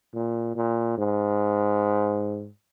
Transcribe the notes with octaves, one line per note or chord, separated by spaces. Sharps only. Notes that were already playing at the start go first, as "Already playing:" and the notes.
A#2
A#2
G#2